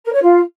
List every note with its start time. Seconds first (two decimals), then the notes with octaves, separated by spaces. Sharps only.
0.05 A#4
0.13 C#5
0.20 F4